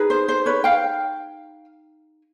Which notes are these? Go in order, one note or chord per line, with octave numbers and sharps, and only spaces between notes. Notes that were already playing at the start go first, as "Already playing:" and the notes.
Already playing: D#4 G#4 B4
C5
C5
B4 C#5
F5 G5